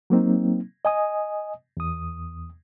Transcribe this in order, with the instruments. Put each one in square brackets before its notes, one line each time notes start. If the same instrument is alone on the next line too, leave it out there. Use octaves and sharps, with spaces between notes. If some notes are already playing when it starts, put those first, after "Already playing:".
[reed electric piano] F#3 A#3 C4 D#4
D#5 G#5 D#6
E2 D#6